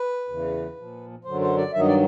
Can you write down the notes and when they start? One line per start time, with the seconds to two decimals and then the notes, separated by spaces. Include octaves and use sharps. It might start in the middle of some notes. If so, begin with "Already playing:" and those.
Already playing: B4
0.28 E2 C#3 E3
0.77 A#2 F3
1.25 F#2 D3 F#3 C5
1.41 C5
1.57 D5
1.73 G2 D#3 F#3 E5
1.80 D#5
1.87 D5